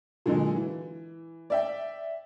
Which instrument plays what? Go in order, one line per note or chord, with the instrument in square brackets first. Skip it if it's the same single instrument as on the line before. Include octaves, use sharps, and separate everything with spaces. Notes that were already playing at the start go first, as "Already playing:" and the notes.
[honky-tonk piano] A#2 D3 F#3 G#3
E3
D5 E5 G5